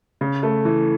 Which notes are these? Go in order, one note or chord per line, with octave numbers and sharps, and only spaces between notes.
C#3
A3
E3